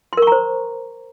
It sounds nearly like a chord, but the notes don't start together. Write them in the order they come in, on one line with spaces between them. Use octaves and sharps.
C6 A#4 C#6 A#5 C5